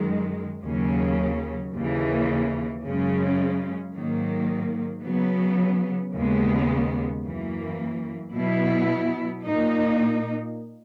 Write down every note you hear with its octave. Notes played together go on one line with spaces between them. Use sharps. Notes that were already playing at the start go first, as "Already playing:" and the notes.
Already playing: F#2 D#3 G#3
D#2 C#3 F#3 C#4
D#2 C#3 E3
F#2 C#3 G#3 C#4
G#2 D#3 F#3 A#3
C#3 F#3 B3
D#2 C#3 G#3 B3
F#2 E3 A#3
B2 F#3 B3 E4
A#2 A#3 D#4